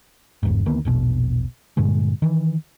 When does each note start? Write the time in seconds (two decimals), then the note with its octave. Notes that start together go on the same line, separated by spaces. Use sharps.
0.43 G1 E2 G#2
0.66 D2 D#3 A#3 B3
0.85 E1 A#1 B2
1.77 G2 A#2 D3 G#3
2.22 D#3 E3